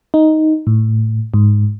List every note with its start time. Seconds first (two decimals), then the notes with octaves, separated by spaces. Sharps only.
0.14 D#4
0.67 A2
1.34 G#2